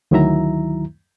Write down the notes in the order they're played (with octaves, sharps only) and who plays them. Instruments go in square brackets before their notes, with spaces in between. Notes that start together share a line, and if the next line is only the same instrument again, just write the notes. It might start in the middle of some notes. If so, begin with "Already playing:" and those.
[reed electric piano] D2 D#3 F#3 E4 E5 A#5